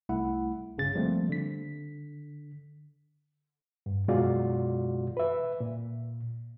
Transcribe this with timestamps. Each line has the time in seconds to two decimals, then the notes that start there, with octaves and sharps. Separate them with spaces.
0.09 C2 A3 E4 F#5
0.77 G1 C#3 A6
0.95 F3 G3 A3 A#3 C4
1.29 D3 B6
3.86 G2
4.08 F#2 B2 G#3 F4 F#4 D5
5.17 B4 E5
5.60 A#2